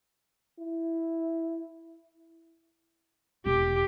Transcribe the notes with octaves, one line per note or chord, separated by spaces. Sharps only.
E4
E1 G4